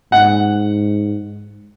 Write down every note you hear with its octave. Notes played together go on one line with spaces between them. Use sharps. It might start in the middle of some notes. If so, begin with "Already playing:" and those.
G#2 F#5